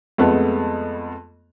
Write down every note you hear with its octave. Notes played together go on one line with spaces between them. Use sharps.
F2 G#3 A3 B3